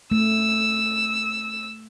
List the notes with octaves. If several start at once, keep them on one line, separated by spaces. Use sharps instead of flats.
A3 E6